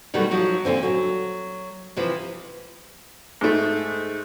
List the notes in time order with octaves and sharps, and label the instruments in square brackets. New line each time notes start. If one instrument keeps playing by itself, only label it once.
[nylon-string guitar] B2 D#3 F#3 G3 A3
F3 F#3 D#4
A#2 D3 C4
F#3
C3 E3 F3
[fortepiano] G#2 A3